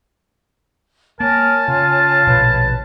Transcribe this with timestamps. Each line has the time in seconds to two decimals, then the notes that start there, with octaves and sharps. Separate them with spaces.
1.20 A#3 A#4 C#5 G#5 A5
1.68 C#3 F4
2.27 A#1 B2 D3 B4 C#5